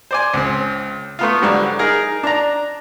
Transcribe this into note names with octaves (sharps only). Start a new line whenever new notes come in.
C5 D5 G#5
C#2 C4
A3 B3 F4
G#2 D3 F#3 G3
D#4 G#4 A#4
D4 A#5